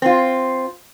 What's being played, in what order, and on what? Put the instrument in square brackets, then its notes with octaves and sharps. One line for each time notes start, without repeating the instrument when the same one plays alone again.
[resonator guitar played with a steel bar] C4 F4